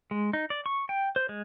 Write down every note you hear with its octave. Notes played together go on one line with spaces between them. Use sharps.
G#3
D#4
D5
C#6
G5
C5
G#3